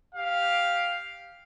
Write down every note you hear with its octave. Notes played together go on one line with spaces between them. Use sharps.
G4 F5